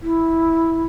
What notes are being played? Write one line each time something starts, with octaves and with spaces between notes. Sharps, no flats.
E4